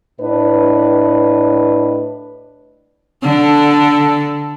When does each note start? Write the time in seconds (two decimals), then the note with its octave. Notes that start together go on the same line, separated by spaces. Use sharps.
0.21 A2 D4 B4 D#5
3.23 D3 A4